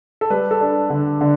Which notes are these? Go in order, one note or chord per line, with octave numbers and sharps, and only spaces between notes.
A4
G3 B4
A4
D4
D3
D3